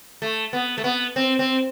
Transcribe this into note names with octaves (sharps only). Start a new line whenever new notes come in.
A3
B3
A3
B3
C4
C4